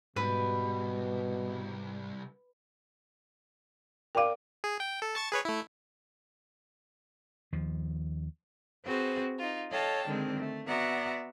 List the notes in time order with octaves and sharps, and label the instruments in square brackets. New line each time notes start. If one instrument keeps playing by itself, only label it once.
[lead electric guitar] C2 G3 [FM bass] G#2 [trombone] B2 [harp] B4
[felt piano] A#4 D5 D6 [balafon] F5 G5
[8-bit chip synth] G#4
G5
A4
A5 C#6 A6
G#4 B4 C#5
A3 E4
[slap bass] D#2 F3
[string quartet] C4 F#4 G#4 B4 C5
D#4 F4
A4 C#5 D#5 F5 G5 A5
D3 D#3 G#3 C4
A3
B3 F#4 D5 E5 F#5 A#5